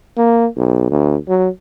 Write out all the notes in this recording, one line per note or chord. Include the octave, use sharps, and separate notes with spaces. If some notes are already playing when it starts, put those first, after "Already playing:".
A#3
B1
D2
F#3